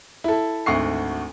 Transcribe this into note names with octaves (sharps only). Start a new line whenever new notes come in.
E4 A4
G#1 D2 F#5 C#6 C7